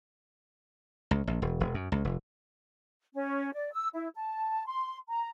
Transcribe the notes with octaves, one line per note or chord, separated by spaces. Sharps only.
C#2
A#1
E1
E1
F#2
C#2
F1
C#4
D5
E6
E4
A5
C6
A#5